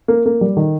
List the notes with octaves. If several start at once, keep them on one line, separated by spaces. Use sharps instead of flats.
A#3
A#3
G3
D#3